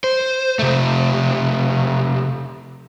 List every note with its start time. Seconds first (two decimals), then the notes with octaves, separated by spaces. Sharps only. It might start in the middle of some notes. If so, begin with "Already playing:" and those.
0.04 C5
0.59 C3 A3